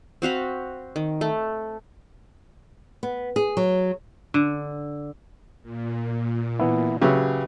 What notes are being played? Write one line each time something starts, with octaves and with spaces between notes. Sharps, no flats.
C4 F#4 F5 B5
D#3
A3
B3
G#4
F#3
D3
A#2
E3 B3 E4
C#3 F#3 G4 B4 E5